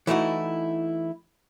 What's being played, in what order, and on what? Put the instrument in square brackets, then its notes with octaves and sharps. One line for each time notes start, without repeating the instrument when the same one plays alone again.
[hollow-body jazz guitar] E3 A3 D#4 E4 F#4